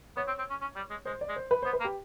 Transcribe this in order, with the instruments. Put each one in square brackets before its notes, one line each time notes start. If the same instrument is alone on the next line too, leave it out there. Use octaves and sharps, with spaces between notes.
[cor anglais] B3 [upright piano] C#5
[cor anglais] C4
C4
C#4
C#4
G3
G#3
[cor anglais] G#3 [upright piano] C5
[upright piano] D5
[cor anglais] G#3
[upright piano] C5
B4
[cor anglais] B3 [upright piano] C5
[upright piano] B4
[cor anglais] A#3
[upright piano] G4